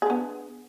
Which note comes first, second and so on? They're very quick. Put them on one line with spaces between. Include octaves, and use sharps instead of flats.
G#4 D4 B3